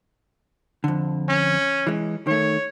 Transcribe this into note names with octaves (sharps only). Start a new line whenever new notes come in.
F2 D3
C#4
E3 G#3
D#3 A3 C#5